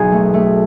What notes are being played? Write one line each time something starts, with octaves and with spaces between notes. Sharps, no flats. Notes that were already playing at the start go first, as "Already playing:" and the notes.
Already playing: B1 G#4
A3
A3